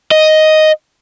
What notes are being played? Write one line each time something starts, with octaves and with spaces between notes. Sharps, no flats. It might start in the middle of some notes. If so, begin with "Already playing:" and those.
D#5